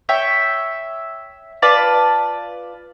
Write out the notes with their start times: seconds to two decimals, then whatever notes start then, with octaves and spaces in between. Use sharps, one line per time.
0.09 C#5 E5 G5
1.62 F4 B4 D5 A5